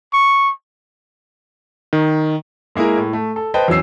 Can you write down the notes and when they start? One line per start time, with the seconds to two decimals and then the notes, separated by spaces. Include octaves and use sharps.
0.13 C#6
1.93 D#3
2.75 G#3 A#3 E4 G#4 A#4
2.98 A2
3.13 A3
3.36 A4
3.54 B4 C5 D#5 G5 A5
3.68 E2 F#3 C#4 E6 C7